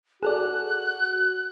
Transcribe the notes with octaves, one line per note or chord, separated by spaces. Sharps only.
F#4 G#4 A4 D5 F#6